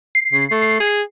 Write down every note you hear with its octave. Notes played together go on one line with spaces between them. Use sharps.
C7
C#3
A3
G#4